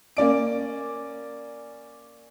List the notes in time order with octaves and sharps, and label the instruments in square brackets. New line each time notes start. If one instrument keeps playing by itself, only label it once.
[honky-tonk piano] A#3 C#4 D5 D7